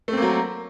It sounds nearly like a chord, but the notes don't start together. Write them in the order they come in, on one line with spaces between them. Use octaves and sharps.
A3 C4 A#3 F#3